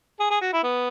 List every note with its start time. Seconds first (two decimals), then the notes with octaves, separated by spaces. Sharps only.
0.20 G#4
0.31 G#4
0.41 F#4
0.53 E4
0.63 B3